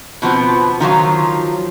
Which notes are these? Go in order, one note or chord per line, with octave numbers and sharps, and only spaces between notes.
B2 F3 B3 C4
D#3 F3 F#3 F4